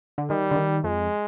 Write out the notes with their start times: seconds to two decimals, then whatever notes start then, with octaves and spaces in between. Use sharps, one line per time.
0.18 D3
0.30 D#3 G3
0.51 D3
0.56 D#3
0.84 F2 G#3